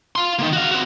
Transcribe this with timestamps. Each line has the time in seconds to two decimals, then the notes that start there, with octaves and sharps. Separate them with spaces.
0.16 F5 C6
0.39 D#3 A#3
0.53 F#4 F5
0.71 C4 F#4